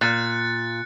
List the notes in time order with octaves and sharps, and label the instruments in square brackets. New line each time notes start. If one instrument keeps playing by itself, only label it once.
[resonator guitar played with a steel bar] A#2 [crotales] F#6 A6 C#7